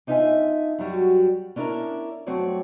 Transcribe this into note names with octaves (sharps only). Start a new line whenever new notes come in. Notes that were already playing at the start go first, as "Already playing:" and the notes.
D4 D#4 F4 D#5 E5 G#5
F#2 F#3 G3 F#4
C#4 D4 E4 A#4
G2 F#3 A3 C4 C#5 D5